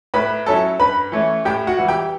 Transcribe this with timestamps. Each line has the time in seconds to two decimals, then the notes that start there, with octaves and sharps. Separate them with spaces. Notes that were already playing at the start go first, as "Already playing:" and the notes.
0.14 A2 B4 B5
0.46 F#3 C#4 E4 A4 A5
0.80 G2 B4 B5
1.12 E3 A3 C#4
1.45 A2 G4 G5
1.67 F#4 F#5
1.78 E3 G3
1.88 G4 G5